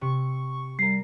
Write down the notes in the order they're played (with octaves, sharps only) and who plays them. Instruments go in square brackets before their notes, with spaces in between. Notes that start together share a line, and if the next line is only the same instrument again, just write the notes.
[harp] C3 [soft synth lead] C#6
[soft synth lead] G3 [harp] A#4 A#6 [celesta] C7